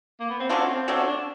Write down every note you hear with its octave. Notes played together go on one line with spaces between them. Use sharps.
A#3
B3
C4
F#3 A3 C#4 D4 F4
C4
F#3 A3 C4 D4 F4
C#4
D4